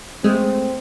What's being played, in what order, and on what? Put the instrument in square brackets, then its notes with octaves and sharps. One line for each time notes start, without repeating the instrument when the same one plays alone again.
[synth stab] G#3 A3 [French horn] C4